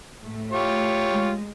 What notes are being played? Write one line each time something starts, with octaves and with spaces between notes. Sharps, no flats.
A2 A3
F4 G4 C#5
G#3